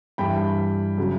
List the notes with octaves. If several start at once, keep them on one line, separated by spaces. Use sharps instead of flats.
G2 E3 G3 G5 B5
C#3 F#3